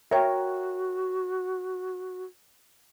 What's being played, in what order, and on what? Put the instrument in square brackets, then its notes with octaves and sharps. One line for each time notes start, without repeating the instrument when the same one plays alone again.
[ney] F#4 [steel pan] A#4 C#5 [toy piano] E5 G5